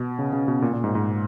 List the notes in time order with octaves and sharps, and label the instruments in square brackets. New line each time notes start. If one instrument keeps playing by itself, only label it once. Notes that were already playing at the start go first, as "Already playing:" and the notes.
Already playing: [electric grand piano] B2
C#3
C#3
B2
A#2
A#2
G#2
G#2